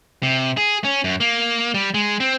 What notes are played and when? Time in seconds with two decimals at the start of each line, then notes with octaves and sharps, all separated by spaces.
0.23 C3
0.57 G#4
0.84 C#4
1.04 F#2
1.20 A#3
1.74 G3
1.94 G#3
2.20 C4